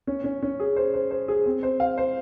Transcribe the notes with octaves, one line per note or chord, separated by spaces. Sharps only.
C#4
C#4
C#4
G#4
C5
C5
C5
G#4
C4
C5
F5
C5